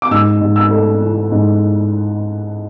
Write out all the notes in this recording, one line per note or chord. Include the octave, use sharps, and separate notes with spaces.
D6
G#2 E6
G#2
E6
A3
E3
G#2